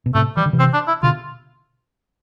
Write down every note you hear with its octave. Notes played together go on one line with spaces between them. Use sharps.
B2
A2 C3 A3
E3 G3
D3
C3 E3
C4
D4
E4
B2 D3 F4